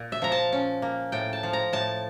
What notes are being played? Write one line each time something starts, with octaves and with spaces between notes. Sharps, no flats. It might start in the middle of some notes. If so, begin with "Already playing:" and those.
Already playing: A#2
E5
F3 A#5
A5
C#4
A#3
A2 G5
A5
F3
A#5
A2 A5